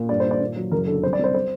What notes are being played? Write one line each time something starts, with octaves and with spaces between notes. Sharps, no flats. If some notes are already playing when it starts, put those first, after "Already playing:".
Already playing: A#2
G2 D5
D#3 C5
D5
A#2
F#3
F#1 A#4
D3 A4
C2 C5
D5
C2
C5
C5